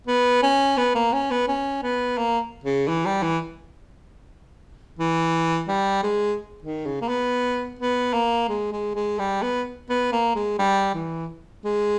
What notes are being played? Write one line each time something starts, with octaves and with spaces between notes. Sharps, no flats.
B3
C#4
B3
A#3
C#4
B3
C#4
B3
A#3
C#3
E3
G3
E3
E3
G3
G#3
D#3
C#3
A#3
B3
B3
A#3
G#3
G#3
G#3
G3
B3
B3
A#3
G#3
G3
E3
G#3